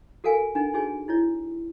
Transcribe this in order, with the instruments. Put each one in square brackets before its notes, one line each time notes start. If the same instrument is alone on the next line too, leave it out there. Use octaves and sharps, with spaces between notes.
[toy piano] F#4 A4 A#4 F5 G#5
D4 D#4 F#5 G#5
D#4 F#4 G#4 C#5 G#5
D#4 E4 C#5